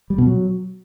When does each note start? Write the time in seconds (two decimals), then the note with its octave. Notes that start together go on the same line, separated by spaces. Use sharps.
0.10 G3
0.18 B2
0.26 F#3